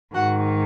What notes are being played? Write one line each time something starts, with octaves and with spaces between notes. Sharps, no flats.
G#2 D#3 F#4 F#5